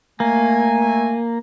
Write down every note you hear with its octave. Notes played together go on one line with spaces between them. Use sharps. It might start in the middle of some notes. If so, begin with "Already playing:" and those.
A3 A#3 G#5